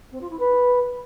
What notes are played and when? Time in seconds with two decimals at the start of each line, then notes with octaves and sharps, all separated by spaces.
0.11 C4
0.20 F4
0.29 E4
0.39 B4